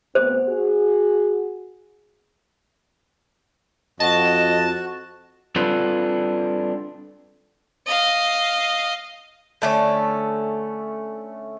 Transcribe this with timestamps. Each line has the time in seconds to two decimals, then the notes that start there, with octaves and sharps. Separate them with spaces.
0.15 D2 B3 C4 C5
0.48 F#4 G#4
4.00 F2 F#4 D#5 A5
5.56 G3 C4 D4 F4 A4 B4
7.86 D#5 F5
9.62 D3 A3 C#4